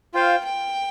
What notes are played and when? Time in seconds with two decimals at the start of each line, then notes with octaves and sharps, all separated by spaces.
0.14 F4 C5 F5 G5
0.45 G5